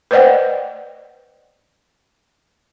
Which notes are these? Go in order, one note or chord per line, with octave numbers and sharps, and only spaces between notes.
B4 C5 D5 D#5 F#5 G5